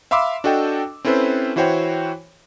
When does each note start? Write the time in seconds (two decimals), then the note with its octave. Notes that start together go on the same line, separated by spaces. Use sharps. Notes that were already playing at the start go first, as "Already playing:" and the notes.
0.11 E5 F5 B5 C6 D6 E6
0.44 D4 F#4 A4 D#5 G5
1.05 C4 C#4 E4 A4 B4 C5
1.56 E3 E4 F#4 C5 C#5 G5